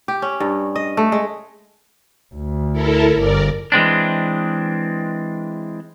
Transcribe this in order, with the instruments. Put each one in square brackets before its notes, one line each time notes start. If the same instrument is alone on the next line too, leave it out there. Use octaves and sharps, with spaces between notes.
[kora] G4
C#4
G2
D#5
A3
G#3
[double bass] D2
[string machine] E4 A4 A#4
[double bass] G1 [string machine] A#4 D5
[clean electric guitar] E3 G#3 C4 D4